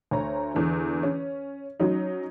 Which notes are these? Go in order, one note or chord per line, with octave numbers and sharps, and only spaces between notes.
D2 C#5 A#5
E2 D3
C#4
F#3 C#4 D#4